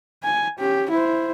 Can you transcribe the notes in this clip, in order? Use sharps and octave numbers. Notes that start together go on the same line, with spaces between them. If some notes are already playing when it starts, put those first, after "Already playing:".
G#5
C#4 G4
E4 C5